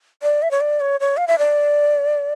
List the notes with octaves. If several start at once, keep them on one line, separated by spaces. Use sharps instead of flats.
D5
E5
C#5
D5
C#5
C#5
F5
E5
D5